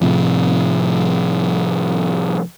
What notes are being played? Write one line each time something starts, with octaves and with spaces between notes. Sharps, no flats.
A2 C3 F3